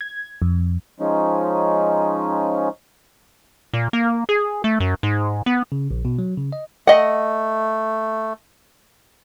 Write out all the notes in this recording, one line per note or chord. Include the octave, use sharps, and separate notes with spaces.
G#6
F2
F3 G#3 C#4 D#4
A#2
A#3
G#4
A3
F#2
G#2
B3
C#3
A#1
B2
F#3
C#3
D#5
A3 D#5 F#5